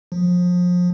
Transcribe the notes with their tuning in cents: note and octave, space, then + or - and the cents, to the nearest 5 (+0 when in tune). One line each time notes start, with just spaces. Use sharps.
F3 +30